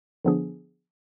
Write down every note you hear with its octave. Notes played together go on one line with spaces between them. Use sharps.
D3 F3 B3 D4 G#4